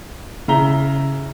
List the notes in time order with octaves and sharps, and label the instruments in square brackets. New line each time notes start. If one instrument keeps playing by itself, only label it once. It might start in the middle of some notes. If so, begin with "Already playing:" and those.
[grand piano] C#3 E4 E5 A#5 G7